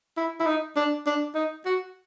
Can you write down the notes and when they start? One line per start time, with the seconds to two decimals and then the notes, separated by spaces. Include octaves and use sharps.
0.17 E4
0.40 E4
0.46 D#4
0.76 D4
1.06 D4
1.35 D#4
1.65 F#4